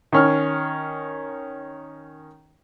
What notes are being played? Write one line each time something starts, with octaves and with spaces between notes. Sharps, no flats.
D#3 C#4 F6